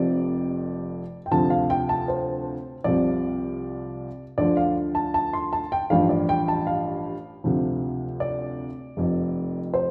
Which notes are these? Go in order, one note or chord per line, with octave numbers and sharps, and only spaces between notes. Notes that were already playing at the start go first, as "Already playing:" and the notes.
Already playing: F1 F2 C3 F3 D5
G5
D2 C3 F3 A5
F5
G5
A5
C5
C2 C3 F3 D5
D2 D3 F3 D5
F5
A5
A5
C6
A5
G5
A1 G2 F3 F5
D5
G5
A5
F5
D2 C3 F3
D5
F1 F2 F3
C5